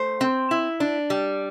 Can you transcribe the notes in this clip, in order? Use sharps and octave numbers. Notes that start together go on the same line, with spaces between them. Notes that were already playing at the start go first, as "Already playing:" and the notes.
Already playing: A3 C5
C4
E4
D4
G3